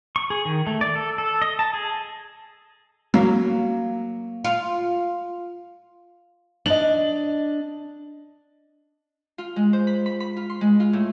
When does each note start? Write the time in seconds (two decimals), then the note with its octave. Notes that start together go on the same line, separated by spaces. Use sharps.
0.16 C#6
0.30 G#4
0.45 D#3
0.67 A3
0.81 D5
0.95 A4
1.18 A4
1.42 D#5
1.59 A5
1.73 G#4
3.14 F#3 A#3
4.44 F4
6.66 D4 D#5 F#7
9.38 F4
9.56 G#3
9.73 C5
9.87 B5
10.06 B5
10.20 B5
10.37 F4
10.50 C6
10.61 G#3
10.80 F4
10.93 A2